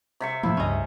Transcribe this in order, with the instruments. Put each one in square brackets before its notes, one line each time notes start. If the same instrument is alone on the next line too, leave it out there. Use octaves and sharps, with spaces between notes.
[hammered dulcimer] C3 E5 C#6
[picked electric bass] A2 F3 A#3 [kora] E4
[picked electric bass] C#2 G2 [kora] C#4 D#5